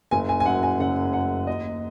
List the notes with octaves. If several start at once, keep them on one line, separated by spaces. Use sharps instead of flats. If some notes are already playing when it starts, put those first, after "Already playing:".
F#1 G#5
G#5
G#5
F#2 F#5
G#5
C#3 F#5
F#2 F#5
D#2 D#5